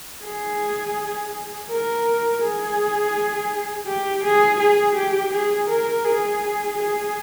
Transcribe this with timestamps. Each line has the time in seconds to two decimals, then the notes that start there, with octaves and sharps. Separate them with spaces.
0.24 G#4
1.69 A#4
2.42 G#4
3.87 G4
4.23 G#4
4.59 G#4
4.95 G4
5.32 G#4
5.68 A#4
6.04 G#4
6.77 G#4